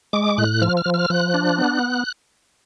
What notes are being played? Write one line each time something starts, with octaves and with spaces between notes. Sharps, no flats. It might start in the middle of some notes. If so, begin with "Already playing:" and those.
G#3 D6
A2 F#6
F3 F6
F6
F3
F6
F3 F#6
D4
B3